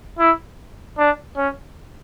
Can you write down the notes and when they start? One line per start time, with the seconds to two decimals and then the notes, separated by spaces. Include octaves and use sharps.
0.19 E4
0.98 D4
1.37 C#4